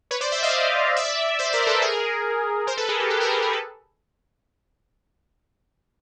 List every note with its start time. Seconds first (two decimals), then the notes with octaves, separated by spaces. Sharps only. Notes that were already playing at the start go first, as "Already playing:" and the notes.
0.11 B4 C#5
0.21 C5 D5
0.32 D5 E5
0.43 D#5 F5
0.96 D5 E5
1.39 C5 D5
1.53 A#4 C5
1.67 A4 B4
1.82 G#4 A#4
2.67 A#4 C5
2.77 A4 B4
2.89 G#4 A#4
3.00 G4
3.10 G4 A4
3.20 G#4 A#4
3.31 G4 A4
3.42 G#4 A#4
3.53 A4 B4